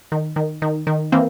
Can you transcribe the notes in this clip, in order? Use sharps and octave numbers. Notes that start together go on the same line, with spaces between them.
D#3
D#3
D#3
D#3
E3 A#3 C4